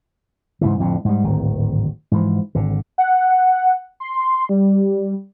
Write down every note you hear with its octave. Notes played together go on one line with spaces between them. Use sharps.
G#2 C#3 E3
F2 A2 D3
G#2 G3
D1 G#1 D#3
G#2 E3 F3
G#1 D3
F#5
C6
G3